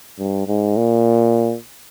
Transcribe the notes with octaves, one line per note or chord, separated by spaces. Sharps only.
G2
G#2
A#2